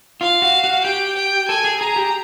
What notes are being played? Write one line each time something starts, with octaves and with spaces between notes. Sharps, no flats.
F4 F5
F#4
F#4
G4 G5
G5
A4 G#5
G#4
G#4 A#5
G4